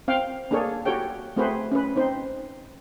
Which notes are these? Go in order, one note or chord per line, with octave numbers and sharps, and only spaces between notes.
C4 F5 G5
A#3 D4 G#4 A4 C#5
F#4 G4 A4 C#5 G5
A3 C4 F#4 G#4 B4 C5
C#4 B4
C4 D#4 C5